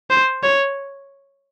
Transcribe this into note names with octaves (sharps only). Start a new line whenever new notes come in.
C5
C#5